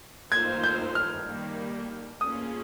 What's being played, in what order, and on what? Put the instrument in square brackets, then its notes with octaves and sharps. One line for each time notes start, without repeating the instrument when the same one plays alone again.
[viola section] D#3 A#3 F4 C5 [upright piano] G#6
[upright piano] G6
F6
[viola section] D#3 G3 A#3
[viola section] A#3 C#4 F4 G#4 [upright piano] D#6